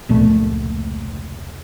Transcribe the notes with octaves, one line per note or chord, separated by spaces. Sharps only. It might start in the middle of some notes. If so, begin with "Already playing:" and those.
F1 C#2 A#2 A3